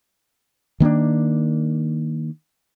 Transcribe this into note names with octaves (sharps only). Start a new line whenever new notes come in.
D#3 A#3 C4 D4